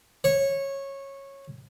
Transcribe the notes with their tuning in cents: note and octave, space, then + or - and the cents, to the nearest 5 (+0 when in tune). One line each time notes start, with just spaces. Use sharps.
C#5 -15